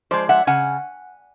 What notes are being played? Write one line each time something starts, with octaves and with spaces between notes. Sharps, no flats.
F3 G#3 C5 D5
E5 F#5
C#3 F#5 G#5